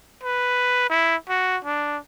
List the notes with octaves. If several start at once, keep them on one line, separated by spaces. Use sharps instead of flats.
B4
E4
F#4
D4